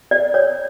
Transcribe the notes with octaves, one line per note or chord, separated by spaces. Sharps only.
D5
C#5